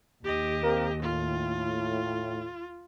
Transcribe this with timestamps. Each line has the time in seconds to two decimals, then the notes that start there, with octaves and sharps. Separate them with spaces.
0.24 D#2 G4 D#5
0.63 A#3 C4 A#4
1.01 A2 F4